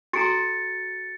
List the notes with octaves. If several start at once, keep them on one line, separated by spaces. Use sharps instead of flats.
F#4 A4 A#5 A6 C#7